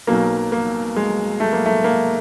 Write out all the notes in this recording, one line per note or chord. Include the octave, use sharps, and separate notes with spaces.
B1 B2 F#3 A#3
A#3
G#3
A3
A#3
A3
A#3